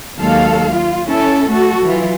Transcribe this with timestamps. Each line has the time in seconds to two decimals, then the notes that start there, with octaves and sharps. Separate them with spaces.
0.16 D#2 F#3 G#3 A4 F5
0.72 F4
1.07 C#4 E4 A4
1.49 A3 F#4 A4
1.84 E3 F#3 F4